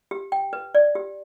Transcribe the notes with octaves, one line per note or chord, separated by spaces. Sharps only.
G4
G5
B4
D5
G4